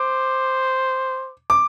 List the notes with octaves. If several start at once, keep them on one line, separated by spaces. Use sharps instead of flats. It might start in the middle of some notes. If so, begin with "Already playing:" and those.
Already playing: C5 D6
D6